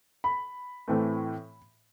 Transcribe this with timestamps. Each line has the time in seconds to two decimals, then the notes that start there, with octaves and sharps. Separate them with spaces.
0.24 B5
0.88 A2 E3 A3 C4